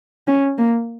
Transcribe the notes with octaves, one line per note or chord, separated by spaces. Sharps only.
C#4
A#3